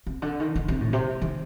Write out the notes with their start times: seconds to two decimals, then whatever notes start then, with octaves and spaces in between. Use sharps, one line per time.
0.07 C3
0.22 D3
0.40 D#3
0.55 D3
0.68 C3
0.81 A2
0.93 C3
1.22 D#3